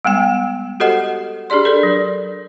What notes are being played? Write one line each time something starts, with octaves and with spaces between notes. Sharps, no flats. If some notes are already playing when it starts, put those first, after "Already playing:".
G3 G#3 B3 G5
F#4 G4 A4 C5 D#5 F#5
D4 G4 G#4 D5 C6
A4 A#4 D5
F#3